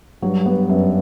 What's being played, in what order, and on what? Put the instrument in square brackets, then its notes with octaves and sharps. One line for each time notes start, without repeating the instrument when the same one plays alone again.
[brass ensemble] G2 [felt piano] F#3
[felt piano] B3
F#2